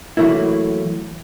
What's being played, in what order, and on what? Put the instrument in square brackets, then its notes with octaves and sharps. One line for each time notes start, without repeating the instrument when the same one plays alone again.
[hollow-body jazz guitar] E3 F#3 A3 A#3 E4